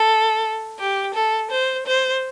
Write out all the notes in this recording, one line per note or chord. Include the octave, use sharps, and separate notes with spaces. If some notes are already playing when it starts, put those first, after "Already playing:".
Already playing: A4
G4
A4
C5
C5